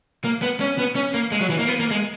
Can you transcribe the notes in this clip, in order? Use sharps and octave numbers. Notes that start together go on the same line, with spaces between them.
A#3
B3
C#4
B3
C#4
A#3
G#3
F#3
E3
A#3
B3
A#3
G#3